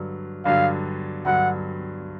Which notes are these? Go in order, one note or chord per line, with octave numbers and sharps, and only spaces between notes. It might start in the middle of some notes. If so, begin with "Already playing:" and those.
Already playing: G2 D3 F#3
G2 D3 F#3 F5
G2 D3 F#3 F#5